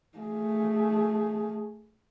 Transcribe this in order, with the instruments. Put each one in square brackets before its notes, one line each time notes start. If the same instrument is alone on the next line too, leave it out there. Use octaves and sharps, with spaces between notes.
[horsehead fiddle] A3 G#4